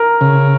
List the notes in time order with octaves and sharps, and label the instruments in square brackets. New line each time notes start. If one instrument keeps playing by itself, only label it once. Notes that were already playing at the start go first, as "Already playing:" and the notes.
Already playing: [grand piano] A#4
[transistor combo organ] C#3